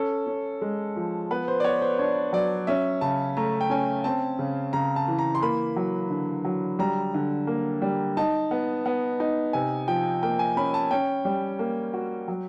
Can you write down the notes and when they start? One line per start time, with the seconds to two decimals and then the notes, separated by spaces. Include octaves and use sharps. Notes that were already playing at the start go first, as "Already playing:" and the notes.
Already playing: C#4 A4
0.27 C#4
0.61 G#3
0.96 F3
1.31 B3 B4
1.48 C5
1.60 D5
1.64 B3 C#5
1.82 C5
1.99 D4 C#5
2.33 F#3 D5
2.67 C#4 E5
3.01 C#3 A5
3.37 A3 A#5
3.61 G5
3.70 C#4 G#5
4.04 C4 A5
4.39 C#3
4.73 C#3 A#5
4.96 A5
5.08 E3
5.19 A#5
5.35 C6
5.42 A#3 B5
5.76 F#3
6.10 D3
6.45 F#3
6.79 G3 A#5
7.14 D3
7.47 A#3
7.82 G3
8.17 D#4 A5
8.51 B3
8.86 B3
9.20 D#4
9.53 C3 G#5
9.88 F3 G5
10.23 A#3 G5
10.39 G#5
10.57 C#4 B5
10.74 A5
10.91 C#4 G5
11.25 G3
11.59 A#3
11.94 F#4
12.28 F#3